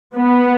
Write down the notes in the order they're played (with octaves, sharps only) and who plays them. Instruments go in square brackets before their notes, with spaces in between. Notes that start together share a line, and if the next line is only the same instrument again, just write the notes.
[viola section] B3